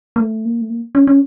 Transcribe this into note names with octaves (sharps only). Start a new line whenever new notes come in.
A#3
A3
A#3
A3
A#3
C#4
C#4